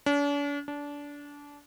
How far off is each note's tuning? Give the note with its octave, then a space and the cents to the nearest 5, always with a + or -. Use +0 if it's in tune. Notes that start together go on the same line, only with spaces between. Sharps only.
D4 -45
D4 -25